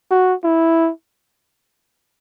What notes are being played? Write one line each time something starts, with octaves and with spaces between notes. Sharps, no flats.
F#4
E4